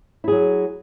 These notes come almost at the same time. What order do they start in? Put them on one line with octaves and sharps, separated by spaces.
E4 G#4 F#3